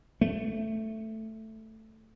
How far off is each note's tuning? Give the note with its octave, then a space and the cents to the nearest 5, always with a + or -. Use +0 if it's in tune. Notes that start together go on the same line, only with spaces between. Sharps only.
A3 +5